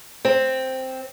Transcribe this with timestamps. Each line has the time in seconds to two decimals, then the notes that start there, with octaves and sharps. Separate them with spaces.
0.25 C4